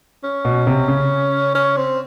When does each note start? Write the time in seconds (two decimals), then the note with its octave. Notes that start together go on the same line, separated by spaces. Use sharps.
0.24 C#4
0.45 B2
0.67 C3
0.88 C#3
1.55 C#4
1.77 C4